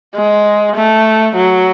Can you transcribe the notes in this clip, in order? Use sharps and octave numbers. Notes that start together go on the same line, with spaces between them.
G#3
A3
F#3